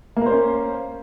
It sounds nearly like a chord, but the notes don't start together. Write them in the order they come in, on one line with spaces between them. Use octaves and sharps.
A#3 A#4 C5 C#4